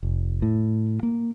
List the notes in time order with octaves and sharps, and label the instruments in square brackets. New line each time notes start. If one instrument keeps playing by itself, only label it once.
[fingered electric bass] F1
A2
A#3